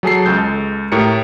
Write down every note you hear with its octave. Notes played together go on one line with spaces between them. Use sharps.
F#3 G#4 A4 C7
C#2 G#3 A4 G6
A2 G4 A#4 C#7